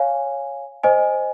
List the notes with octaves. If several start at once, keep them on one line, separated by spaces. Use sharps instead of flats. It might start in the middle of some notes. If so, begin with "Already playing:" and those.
Already playing: C#5 F5 G#5
C5 D#5 G#5